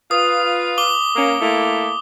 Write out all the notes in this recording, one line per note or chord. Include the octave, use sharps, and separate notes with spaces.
F4 B4 D#6
D6 G7
A#3 C#4
A3 A#3 E4